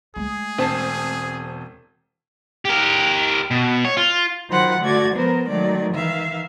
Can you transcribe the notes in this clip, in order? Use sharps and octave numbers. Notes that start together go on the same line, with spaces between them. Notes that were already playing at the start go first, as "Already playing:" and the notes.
G#3 A3 G#4
E1 C4 A5 C7
G4 A#4
B2
C#5
F4
D#3 F#3 F4 C5 F#5 B5
D3 A3 F#4 D5 G#6
F3 G#3 B3 A#4 C5
D#3 F#3 G#3 A3 D5
D#3 E3 E5 F5